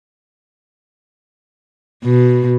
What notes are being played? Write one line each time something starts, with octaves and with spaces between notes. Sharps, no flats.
B2